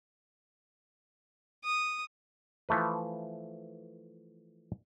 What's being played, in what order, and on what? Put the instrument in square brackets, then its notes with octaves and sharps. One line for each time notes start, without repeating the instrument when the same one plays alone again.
[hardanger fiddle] D#6
[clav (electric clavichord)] E3 F3 A3 B4